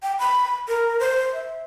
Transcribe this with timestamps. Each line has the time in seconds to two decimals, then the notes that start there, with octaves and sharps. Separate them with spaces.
0.03 G5
0.19 B5
0.68 A#4
1.00 C5
1.33 E5